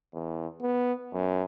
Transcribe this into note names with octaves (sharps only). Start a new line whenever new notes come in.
E2
B3
F#2